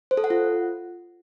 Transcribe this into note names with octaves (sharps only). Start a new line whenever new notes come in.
C5
A4
F#5
F4